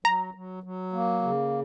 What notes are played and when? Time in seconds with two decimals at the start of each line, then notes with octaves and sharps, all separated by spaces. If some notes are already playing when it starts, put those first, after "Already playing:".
0.05 F#3 A#5
0.34 F#3
0.63 F#3
0.93 A#3
1.22 C#3